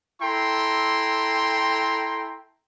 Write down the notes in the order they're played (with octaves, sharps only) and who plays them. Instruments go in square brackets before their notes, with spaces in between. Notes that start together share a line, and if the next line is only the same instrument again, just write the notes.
[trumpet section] E4 A4 G5 A#5 C6